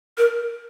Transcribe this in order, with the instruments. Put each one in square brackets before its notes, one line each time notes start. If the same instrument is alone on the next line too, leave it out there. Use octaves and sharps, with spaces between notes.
[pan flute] A#4